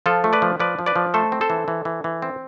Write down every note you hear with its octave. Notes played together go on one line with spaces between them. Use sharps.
F3 F4 A4
A3
B4 D5
F3
F3 B4 D5
F3
B4 D5
F3
A3 A4 C5
C4
A4 C5
E3
E3
E3
E3
C4